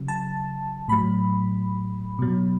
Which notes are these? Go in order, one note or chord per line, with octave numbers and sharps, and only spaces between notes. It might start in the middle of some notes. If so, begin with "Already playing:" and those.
Already playing: C#3 F#3
A5
A2 F#3 B5
B2 F#3